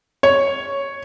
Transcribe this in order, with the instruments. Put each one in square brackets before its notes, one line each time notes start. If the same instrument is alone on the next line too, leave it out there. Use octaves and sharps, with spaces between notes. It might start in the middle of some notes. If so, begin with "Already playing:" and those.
[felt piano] C#5